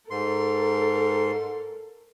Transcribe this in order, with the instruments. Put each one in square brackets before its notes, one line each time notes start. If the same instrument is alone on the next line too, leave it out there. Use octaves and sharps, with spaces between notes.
[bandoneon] G#2 C6 [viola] A4 A#4